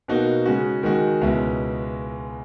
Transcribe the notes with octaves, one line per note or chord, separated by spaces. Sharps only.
B2 A#3 D#4 F#4
C#3 G#3 C#4 F#4
D#3 G#3 D#4 F#4
C#2 B2 G#3 C#4 E4